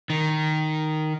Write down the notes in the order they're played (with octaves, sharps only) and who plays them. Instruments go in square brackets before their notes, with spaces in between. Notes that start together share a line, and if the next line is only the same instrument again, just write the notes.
[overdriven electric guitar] D#3